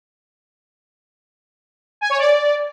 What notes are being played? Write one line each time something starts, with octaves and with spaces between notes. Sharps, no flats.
G#5
C#5
D5